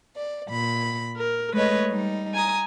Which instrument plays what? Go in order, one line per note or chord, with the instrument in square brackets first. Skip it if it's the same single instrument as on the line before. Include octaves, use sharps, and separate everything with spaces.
[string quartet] D5
A#2 B5
A#4
G#3 A3 B4 C#5 D#5
G3 D#4
G#5 A#5 D#6